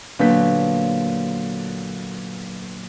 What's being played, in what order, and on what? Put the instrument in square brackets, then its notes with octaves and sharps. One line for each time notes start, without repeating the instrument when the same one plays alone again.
[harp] A#2 F#3 G6 [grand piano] D3 B3 B6